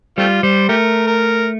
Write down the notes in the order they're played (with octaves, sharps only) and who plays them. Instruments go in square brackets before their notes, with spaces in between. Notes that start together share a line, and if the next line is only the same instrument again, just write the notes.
[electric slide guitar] G3 [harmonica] A3 C4 F4
[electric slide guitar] G3 [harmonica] C5
[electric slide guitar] A3 [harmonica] G4 A#4
[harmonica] A#4